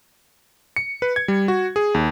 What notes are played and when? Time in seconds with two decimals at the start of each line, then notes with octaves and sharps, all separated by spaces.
0.76 C#7
1.02 B4
1.16 G#6
1.28 G3
1.48 F#4
1.76 G#4
1.94 D#2